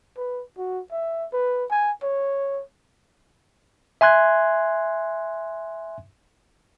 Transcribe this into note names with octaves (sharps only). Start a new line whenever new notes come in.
B4
F#4
E5
B4
G#5
C#5
E5 G#5 C6 F#6 G#6